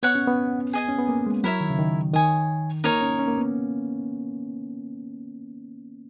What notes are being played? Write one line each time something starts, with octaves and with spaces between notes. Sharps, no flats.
B3 C#5 F#5 C#6
C#4
B3
G#4 D#5 G#5
C#4
B3
A#3
G#3
F#3 E4 A#4 C#5 E5
D#3
C#3
D#3
D#3 C#5 G#5 D#6
A#3 D#4 A#4 C#5
C#4
C#4
A#3
B3